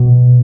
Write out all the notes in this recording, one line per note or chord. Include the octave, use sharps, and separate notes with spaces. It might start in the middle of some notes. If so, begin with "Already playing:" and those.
Already playing: B2